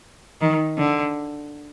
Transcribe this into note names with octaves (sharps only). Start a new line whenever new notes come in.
D#3
D3